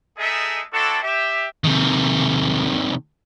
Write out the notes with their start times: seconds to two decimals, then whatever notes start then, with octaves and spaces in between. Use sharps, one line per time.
0.18 G#3 A3 D#4 G#4 A4 E5
0.73 C4 D4 E4 F#4 A4
1.02 G4 E5
1.64 C3 D#3